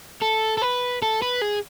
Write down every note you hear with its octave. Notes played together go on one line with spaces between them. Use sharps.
A4
A4
B4
A4
B4
G#4